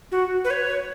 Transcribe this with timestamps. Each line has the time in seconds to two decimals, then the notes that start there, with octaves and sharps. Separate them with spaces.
0.12 F#4
0.44 B4
0.51 C#5